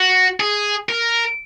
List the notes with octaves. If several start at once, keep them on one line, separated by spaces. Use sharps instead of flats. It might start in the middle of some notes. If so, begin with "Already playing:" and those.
Already playing: F#4
G#4
A#4